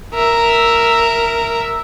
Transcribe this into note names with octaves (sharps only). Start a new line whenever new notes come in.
A#4 E5